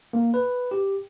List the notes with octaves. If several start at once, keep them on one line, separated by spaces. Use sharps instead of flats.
A#3
B4
G4